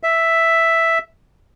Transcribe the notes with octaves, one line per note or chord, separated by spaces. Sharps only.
E5